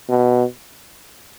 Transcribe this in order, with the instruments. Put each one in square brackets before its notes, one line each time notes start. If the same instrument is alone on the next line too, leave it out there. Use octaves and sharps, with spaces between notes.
[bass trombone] B2